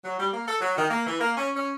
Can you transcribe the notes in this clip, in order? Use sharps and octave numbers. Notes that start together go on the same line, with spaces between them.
F#3
G3
A#3
A4
F#3
D#3
A#3
E3
A#3
C#4
C#4